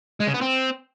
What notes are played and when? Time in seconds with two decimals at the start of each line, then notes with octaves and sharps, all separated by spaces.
0.20 G#3
0.27 C#3
0.34 B3
0.41 C4